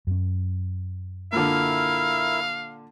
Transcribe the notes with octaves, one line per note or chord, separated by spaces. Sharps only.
F#2 C#4
A#2 D3 E4 A#4 E5 F5